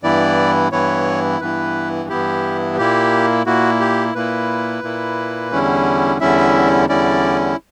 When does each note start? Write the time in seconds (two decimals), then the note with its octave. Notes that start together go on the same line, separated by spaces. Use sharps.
0.03 G2 E3 B3 E4 D5
0.72 G2 E3 B3 E4 C#5
1.41 G2 E3 B3 E4 B4
2.09 G2 E3 B3 E4 G4
2.78 A#2 A#3 E4 G4
3.46 A#2 A#3 E4 F#4
3.80 G4
4.15 A#2 A#3 E4 B4
4.83 A#2 A#3 E4
5.52 E2 D3 G3 C#4 E4
6.21 E2 D3 G3 C#4 E4 E5
6.89 E2 D3 G3 C#4 E4 D5